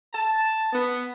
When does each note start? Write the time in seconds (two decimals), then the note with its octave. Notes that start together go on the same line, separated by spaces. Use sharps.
0.14 A5
0.73 B3